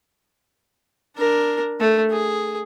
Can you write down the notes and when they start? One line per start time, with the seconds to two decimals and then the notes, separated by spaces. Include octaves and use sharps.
1.17 D4 A#4
1.80 A3
2.10 G#4